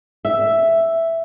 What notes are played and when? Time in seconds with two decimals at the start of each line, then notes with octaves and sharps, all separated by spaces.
0.25 E5